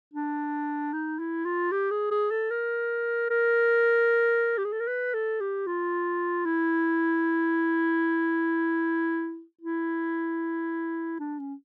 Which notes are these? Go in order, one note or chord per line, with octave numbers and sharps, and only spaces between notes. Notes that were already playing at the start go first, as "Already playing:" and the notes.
D4
D#4
E4
F4
G4
G#4
G#4
A4
A#4
A#4
G4
G#4
A4
A#4
B4
A4
G4
F4
E4
E4
D4
C#4